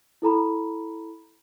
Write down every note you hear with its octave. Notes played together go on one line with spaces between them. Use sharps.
E4 A4 A#5 B5